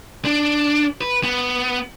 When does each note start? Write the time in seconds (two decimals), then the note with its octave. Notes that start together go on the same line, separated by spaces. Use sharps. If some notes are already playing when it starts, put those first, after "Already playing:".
0.25 D4
1.01 B4
1.23 B3